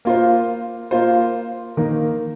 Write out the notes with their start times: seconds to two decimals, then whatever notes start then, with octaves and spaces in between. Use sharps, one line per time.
0.05 A#3 F4 C5
0.91 A#3 F4 C5
1.77 D#3 A#3 D#4 A#4